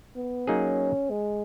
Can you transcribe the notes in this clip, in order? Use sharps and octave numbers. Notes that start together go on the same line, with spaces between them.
B3
F#3 A#3 C#4 D#4 G#4
G#3